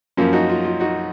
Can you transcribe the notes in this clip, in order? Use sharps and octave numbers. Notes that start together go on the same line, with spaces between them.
F#2 F3 A#3 C#4 F4
D#4 F#4
F4
F4
D#4 F#4